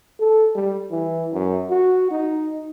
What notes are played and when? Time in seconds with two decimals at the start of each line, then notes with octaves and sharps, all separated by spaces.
0.20 A4
0.55 G3
0.91 E3
1.33 F#2
1.70 F#4
2.11 D#4